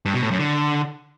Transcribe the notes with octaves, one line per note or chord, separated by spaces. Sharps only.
G2
B2
A2
F#2
D3